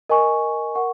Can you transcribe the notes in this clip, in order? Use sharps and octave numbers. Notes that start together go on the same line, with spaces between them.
A#4 D#5 G#5 C#6
A#4 F#5 C#6